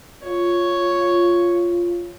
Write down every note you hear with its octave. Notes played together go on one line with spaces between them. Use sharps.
F4 C#5